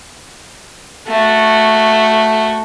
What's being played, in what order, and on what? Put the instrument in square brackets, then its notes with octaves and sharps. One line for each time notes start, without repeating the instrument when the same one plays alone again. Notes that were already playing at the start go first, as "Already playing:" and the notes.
[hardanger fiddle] A3 F#4